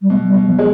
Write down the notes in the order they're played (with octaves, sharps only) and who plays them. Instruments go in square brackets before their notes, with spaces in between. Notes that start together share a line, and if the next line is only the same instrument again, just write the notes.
[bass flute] G3
[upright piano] B2 [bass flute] G#3
[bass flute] F#3
G3
[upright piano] B2
[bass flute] F3
[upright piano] G#3